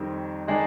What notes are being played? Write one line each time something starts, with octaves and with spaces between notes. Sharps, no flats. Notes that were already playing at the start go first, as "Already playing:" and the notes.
Already playing: F2 D#3 G3 C4
D#3 G#3 D4